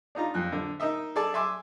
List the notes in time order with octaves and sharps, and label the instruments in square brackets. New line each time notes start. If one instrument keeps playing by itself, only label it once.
[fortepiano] D4 D#4 F4 A#5
F2 F#6
D3
D#4 A#4 D#5 E5
G#4 A4 D5 A5
E5 G#5 C6 D6